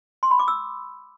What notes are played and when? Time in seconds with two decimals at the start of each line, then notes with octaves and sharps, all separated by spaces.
0.23 C6
0.31 B5
0.39 D6
0.48 E6